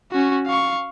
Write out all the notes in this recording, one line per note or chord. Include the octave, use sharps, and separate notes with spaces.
C#4 F#4
F5 C#6